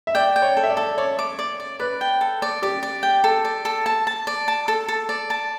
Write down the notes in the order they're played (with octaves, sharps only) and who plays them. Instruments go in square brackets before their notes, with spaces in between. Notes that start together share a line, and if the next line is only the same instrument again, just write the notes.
[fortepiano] E5
[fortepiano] D5 [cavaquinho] G5
[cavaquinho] G5
[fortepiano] C#5
[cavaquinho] A4
[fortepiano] E5
D5
[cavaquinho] A4
[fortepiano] C#5 [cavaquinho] D5
[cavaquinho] D6
D5
D5
[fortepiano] B4 [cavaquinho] D5
[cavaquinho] G5
A4
D5
[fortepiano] G4 [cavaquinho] D5
[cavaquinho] D5
G5
A4
D5
A4
A5
A5
D5
A5
A4
A4
D5
A5